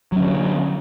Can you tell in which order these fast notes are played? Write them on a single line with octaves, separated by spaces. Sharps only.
F#3 C#4 D3